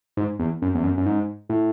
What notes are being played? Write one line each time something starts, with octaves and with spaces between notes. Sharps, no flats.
G#2
E2
F#2
E2
F#2
F#2
G#2
A2